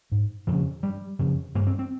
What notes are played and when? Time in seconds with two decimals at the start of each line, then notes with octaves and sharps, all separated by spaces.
0.12 G#2
0.47 F2 C#3 F3
0.83 G2 G3
1.19 F2 C#3
1.55 G2 A#3
1.67 C4
1.79 C4